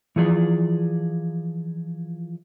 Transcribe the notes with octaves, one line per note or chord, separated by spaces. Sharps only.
E3 F3 G#4 D5